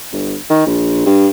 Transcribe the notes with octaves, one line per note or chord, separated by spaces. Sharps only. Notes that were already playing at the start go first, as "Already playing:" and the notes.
G1
D#3
A#1
G2